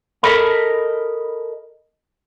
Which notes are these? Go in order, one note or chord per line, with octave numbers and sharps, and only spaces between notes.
A4 A#4 D#5 B5